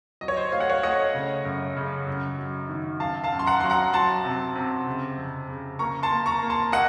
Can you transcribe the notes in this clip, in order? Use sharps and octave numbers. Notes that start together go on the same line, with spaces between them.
F#3 D#5
C#5
C5 D#5
A3 F5
F#5
C#5 F5
A3 D#5 F#5
C#3
F#2
C#3
F#2
F#3
D#3
F#2 F5 A5
F5 A5
F#2
C6
F#5 A#5
F#3 C6
F#5 A#5
F#3 A5 C6
C3
C3
C#3
F2
C#3
A#3 A#5 C#6
A5 C6
A#3
A#5 C#6
A#3
A5 C6
A#3 D#5 F#5